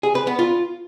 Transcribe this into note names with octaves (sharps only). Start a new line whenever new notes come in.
G#4
B4
B3
F4